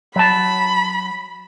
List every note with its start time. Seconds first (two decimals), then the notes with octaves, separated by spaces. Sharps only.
0.16 F#3 A5 B5